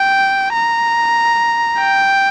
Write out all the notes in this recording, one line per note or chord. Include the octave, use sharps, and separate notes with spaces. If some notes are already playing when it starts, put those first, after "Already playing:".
Already playing: G5
A#5
G5